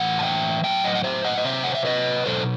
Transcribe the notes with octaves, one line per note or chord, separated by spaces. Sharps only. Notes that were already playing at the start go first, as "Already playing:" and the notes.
Already playing: A2 E3 F#5
A5
E5 G5
A2 F#3 E5 G5
D#5 F#5
F#5
C5 E5
D#5 F#5
D#5
C3 F#3 C5 E5
F#5
E5
B4 D#5
B2 F#3 A4 C5